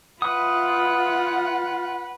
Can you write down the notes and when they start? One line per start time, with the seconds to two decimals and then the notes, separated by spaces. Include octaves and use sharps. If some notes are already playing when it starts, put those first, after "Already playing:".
0.22 F4 B4 F#5 D#6